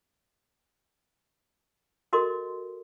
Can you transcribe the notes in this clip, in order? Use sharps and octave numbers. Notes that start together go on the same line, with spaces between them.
F#4 A4 A#4 D#5 C6 D6